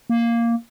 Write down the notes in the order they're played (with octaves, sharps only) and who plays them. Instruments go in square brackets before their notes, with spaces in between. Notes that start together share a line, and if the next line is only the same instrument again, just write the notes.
[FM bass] A#3